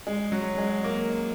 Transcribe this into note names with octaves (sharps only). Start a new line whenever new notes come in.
G#3
F#3
G#3
A#3